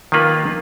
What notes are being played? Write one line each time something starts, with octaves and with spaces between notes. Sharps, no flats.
D#3 A#3 F4 B4